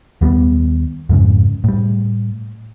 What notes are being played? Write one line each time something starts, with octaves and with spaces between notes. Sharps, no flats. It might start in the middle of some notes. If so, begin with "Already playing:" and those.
D#2 G3 G#3 B3
F2 G#2 C#3
A2 G3